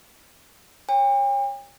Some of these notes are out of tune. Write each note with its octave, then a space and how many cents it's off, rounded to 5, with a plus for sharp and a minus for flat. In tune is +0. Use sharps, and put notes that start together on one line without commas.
C#5 -10 G5 +45